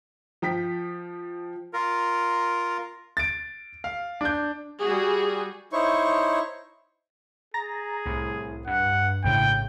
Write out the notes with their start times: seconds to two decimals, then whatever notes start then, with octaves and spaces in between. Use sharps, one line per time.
0.42 F3 G5 B6
1.73 F4 A#4
3.17 A6 D7
3.84 F5
4.21 D4 G6
4.80 G3 F#4 G#4
5.72 D#4 E4 C5 C#5 C#6
7.54 G#4 A#5 A6 A#6
8.06 C2 A2
8.67 G2 F#5
9.24 A#1 A2 C#3 G5